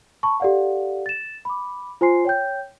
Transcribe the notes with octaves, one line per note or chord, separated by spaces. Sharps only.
A5 B5 C#6
G4 A4 D5 F5 F#5
A6 E7
B5 D6
F4 C5 G#5 C6 C7
C#5 G5 G6